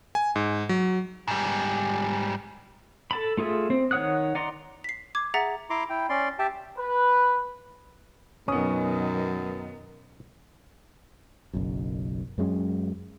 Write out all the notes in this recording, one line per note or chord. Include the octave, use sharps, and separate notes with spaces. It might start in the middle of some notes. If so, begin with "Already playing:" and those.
G#5
G#2
F#3
G#2 G3
A4 A5 B5
A3 F4 G#4 E5
C4
D#3 C#5 F#5 D#6 F#6
D#4 D5 F#5 A#5 C6
B6 C7
D6 G#6
G#4 E5 F#5 A#5 A6 B6
E4 A#5 C6 D6
E4 G5
C#4 D5 C6
G4 E5 G5 A5
B4
F#2 B2 D#3 F#3 B3 C#4 D#6
F#1 B1 F#2
F#2 F#3 G#3 C#4